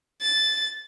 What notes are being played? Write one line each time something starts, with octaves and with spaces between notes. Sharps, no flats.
A6